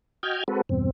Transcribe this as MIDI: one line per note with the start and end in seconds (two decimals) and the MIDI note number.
0.23 0.44 66
0.23 0.44 75
0.23 0.44 79
0.23 0.44 89
0.23 0.44 91
0.23 0.44 92
0.48 0.61 56
0.48 0.61 60
0.48 0.61 66
0.48 0.61 69
0.48 0.61 71
0.69 0.90 40
0.69 0.90 43
0.69 0.90 47
0.69 0.90 60